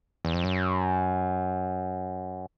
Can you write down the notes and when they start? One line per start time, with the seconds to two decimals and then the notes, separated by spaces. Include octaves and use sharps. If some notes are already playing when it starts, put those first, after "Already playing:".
0.25 E2
0.34 F2
0.44 F#2